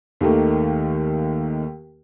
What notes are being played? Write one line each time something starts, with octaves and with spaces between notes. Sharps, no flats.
D#2 D#3 A3 A#3